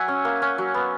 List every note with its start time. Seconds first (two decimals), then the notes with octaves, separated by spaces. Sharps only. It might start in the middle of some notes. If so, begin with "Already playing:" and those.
Already playing: F#3 E5 F#5 G#5
0.08 C#4
0.25 A#3
0.42 C#4
0.58 F#3
0.74 B3